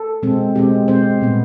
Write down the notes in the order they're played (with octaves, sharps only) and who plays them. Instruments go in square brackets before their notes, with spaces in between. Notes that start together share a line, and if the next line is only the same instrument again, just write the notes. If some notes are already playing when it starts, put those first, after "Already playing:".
Already playing: [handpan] A4
B2 G#3 C4
B2 G#3 C4 G4
B2 G#3 C4 C5
A#2 G3 B3